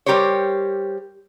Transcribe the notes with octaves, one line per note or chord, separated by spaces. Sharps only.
G3 G4 A#4 C5 C#5